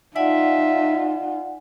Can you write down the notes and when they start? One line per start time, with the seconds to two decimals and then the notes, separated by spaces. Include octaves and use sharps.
0.16 D#4 F4 D5 E5 F#5 G#5